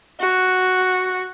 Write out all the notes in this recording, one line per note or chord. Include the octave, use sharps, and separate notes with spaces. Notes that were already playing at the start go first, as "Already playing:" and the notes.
F#4